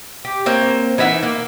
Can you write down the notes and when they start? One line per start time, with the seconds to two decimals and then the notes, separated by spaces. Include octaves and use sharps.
0.25 G4
0.46 A#3 C4 C#5
0.98 E3 D#4 E5 F#5
1.23 A#3